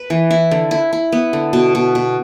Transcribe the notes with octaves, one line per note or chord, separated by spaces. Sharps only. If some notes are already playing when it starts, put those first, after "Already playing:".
Already playing: B4
E3
E4
D3
E4
E4
B3
D3
B2
B2
B2